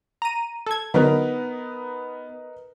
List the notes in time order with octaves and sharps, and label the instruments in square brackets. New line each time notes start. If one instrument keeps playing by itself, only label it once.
[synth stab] A#5 D#7
A4 G#6
[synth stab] D3 F#3 [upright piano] B3 [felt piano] D#4 A#4 B4